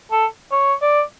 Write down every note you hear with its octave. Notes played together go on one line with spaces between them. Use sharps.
A4
C#5
D5